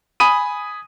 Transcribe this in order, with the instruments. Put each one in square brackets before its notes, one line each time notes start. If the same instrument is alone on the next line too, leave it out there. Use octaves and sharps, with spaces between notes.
[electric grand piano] G#5 B5 D#6 D#7